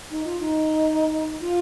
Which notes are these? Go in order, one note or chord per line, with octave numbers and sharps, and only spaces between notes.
D#4
F4
D#4
F4